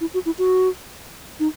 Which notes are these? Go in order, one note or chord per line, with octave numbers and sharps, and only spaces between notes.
E4
F#4
E4
F#4
D#4